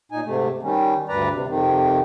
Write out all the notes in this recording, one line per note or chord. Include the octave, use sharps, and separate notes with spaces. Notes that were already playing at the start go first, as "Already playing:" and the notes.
A#2 D#4 G#5
G#2 C3 A3
D#3 G3 C#4
D2 G2 B4 D5 A#5
C3
F2 C3 D#3